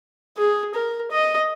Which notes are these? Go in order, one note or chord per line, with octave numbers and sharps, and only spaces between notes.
G#4
A#4
D#5